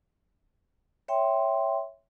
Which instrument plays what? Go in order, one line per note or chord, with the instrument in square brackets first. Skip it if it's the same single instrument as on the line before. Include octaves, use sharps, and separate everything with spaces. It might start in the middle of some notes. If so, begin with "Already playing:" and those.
[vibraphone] C#5 E5 G5 C6